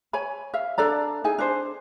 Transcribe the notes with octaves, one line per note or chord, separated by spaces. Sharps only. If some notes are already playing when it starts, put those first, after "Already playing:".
C#5 G#5 B5
E5 F5
D4 A4 D5 A#5
D#4 E4 G#4 G#5
D4 C5